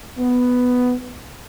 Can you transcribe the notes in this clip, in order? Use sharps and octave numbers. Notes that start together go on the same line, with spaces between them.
B3